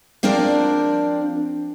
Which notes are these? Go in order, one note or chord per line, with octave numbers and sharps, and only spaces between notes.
F3 C4 D4 A#4 C5 D5